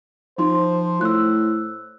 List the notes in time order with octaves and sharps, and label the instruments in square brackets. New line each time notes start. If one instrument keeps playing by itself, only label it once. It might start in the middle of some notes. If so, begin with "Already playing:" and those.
[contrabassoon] F3 [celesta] D#4 C6 [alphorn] C5
[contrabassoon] A2 [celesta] E6 F#6